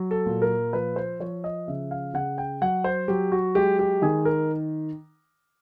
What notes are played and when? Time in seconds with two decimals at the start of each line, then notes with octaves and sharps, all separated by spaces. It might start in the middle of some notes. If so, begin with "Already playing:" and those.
Already playing: F#3
0.11 A4
0.26 A#2
0.42 A#4
0.73 F3 B4
0.96 C5
1.20 F3 C#5
1.44 D#5
1.67 C#3 E5
1.91 F5
2.14 C#3 F#5
2.38 G5
2.61 F#3 F#5
2.84 C5
3.08 F#3 G4
3.32 F#4
3.55 G#3 G4
3.79 G4
4.02 D#3 G#4
4.25 A#4